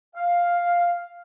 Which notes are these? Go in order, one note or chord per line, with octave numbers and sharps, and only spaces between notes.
F5